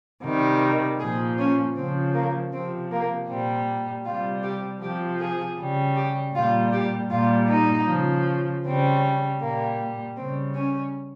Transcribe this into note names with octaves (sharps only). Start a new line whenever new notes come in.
C3 D#3 G3
A#2 F3 G#4
C#4
C#3 F3 C4
A#3
C3 F3 C4
A#3
A#2 G3 C4
C3 G3 F4
G4
C3 F3 G4
G#4
C#3 G3
G4
A#2 G3 F4
G4
A#2 G3 F4
D#4
C#3 F3
C#3 G3 C4
A#2 G3 A#3
C#3 G3 C4
C#4